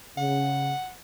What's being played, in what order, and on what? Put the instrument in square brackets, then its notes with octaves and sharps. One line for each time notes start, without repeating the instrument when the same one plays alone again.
[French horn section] C#3 [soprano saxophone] F#5